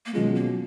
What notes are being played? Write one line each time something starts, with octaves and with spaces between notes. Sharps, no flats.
A#3
B2 F#3 G#3 C#4 F4 G#4
A#3